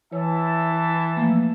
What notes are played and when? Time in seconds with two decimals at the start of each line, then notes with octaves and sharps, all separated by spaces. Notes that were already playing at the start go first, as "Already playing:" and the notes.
0.13 E3 C#5 E5 A5
1.17 F3 A3 A#3